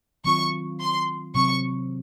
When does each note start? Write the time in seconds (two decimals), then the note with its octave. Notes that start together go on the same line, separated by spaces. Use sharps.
0.25 D#3 F#3 C4 F4 C#6
0.80 C6
1.35 C3 F#3 C4 C#6